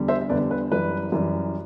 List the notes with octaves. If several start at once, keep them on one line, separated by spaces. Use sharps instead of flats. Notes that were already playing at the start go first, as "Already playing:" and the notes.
Already playing: E2 D3 G3
C5 E5
E5
E2 D3 G3 B4 D5
B4
F#2 E3 G3 B4
F#2 E3 G3